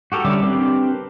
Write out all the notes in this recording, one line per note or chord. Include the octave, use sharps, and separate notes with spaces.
F#4 G4 A4 A#4
D3 G3 C#4 E5 D6
C4 D4 G4 A#4 B4